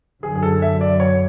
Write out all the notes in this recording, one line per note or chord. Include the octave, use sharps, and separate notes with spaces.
F#2 D3 F#3 G#4
G#4
A4
E5
D5
C#5